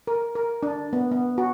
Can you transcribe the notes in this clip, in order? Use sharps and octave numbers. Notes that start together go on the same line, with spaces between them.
A#4
A#4
D4
B3
B3
F#4